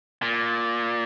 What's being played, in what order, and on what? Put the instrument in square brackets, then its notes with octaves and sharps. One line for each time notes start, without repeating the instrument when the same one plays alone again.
[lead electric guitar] A#2